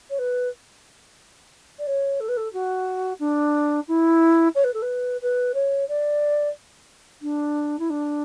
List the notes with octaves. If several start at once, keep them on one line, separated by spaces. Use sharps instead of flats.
C#5
B4
D5
C#5
A4
B4
A4
F#4
D4
E4
C#5
B4
A4
B4
B4
C#5
D5
D4
E4
D4